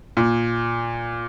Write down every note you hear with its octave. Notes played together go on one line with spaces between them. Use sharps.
A#2